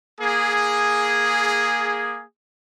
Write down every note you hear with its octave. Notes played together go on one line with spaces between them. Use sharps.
A#3 G#4